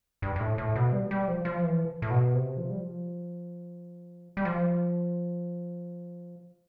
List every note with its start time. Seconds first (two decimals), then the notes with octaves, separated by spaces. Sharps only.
0.22 G2
0.36 G2
0.40 A2
0.58 A2
0.76 B2
0.92 G3
1.11 G3
1.28 F3
1.45 F3
1.64 E3
2.02 A2
2.10 B2
2.34 C3
2.57 F3
2.70 G3
2.81 F3
4.37 G3
4.45 F3